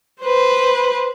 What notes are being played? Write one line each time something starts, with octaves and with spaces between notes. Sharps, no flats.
B4 C5